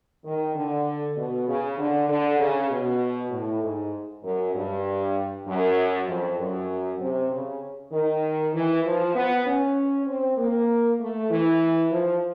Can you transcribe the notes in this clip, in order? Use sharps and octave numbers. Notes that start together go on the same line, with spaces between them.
D#3
D3
B2
C#3
D3
D3
C#3
B2
A2
G#2
F#2
G2
F#2
F2
F#2
C3
C#3
D#3
E3
F3
B3
C#4
C4
A#3
A3
E3
F3